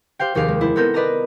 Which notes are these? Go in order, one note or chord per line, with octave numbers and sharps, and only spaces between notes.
G4 C5 F5 G5
F1 D#2 G4 G#4 F5 D6
G#3
E4 C5
B3 C4 A4 A#4 G6
B4 D5 D#5 A5 A#5